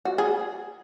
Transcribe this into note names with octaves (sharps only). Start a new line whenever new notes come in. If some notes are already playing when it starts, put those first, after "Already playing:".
F#4
G#4